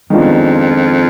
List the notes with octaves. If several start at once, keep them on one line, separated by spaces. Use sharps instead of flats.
F2 D#3 G#3 B3 D4 F4